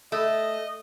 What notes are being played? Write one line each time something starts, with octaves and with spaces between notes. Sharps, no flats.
A3 D#5